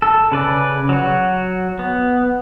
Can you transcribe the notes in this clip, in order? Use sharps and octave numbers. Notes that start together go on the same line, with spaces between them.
A4
C#3 B4 D5
F#3 F#4
B3